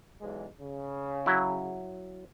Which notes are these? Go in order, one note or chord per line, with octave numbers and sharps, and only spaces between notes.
B1 E2 G#3
C#3
F#3 E4